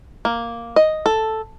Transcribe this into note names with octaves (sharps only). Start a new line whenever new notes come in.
A#3
D#5
A4